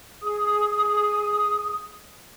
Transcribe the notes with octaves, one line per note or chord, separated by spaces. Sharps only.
G#4 D#6